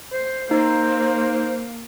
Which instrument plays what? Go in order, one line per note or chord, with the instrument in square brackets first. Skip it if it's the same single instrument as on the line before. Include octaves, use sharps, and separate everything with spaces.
[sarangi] C5
[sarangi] A#3 [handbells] D#4 [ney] C5